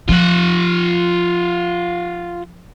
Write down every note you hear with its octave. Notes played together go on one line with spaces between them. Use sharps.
F3 F4 F#5